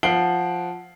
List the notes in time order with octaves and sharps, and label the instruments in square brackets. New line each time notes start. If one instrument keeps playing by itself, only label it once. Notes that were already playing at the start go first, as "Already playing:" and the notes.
[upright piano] F3 F#5 C7 D7 F#7 G7